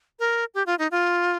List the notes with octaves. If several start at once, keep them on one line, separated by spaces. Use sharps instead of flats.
A#4
G4
F4
D#4
F4